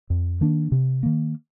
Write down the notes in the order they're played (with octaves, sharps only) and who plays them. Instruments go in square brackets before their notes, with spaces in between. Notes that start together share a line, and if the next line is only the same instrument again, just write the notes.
[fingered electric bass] F2
D#3 A#3 D4
C3
D#3 A#3